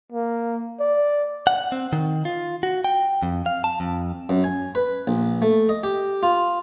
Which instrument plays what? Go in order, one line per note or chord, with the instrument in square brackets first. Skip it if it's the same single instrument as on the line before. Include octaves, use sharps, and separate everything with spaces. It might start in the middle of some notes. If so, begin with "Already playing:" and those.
[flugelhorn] A#3
D5
[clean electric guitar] F#5
C4
D#3
F4
F#4
G5
F2
F5
A5
F2
[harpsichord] F#2
G#5
B4
A#1
A3
D#5
G4
F4